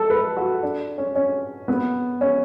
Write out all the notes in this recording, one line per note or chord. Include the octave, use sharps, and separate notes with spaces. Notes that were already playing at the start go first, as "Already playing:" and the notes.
Already playing: A4
B4
F#4
D4
C#4
C#4
B3
C#4